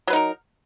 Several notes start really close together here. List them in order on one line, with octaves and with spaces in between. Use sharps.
F#3 B4 D#4 A#4